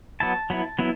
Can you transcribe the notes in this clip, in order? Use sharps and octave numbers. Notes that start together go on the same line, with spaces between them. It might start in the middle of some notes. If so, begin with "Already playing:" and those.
F#3 B3 E4 A5
F#3 B3 E4
F#3 B3 E4